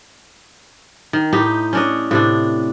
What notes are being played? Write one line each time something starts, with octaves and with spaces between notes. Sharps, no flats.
D#3
A2 D#4 G4
C#4 D4 D#5
A2 C3 D4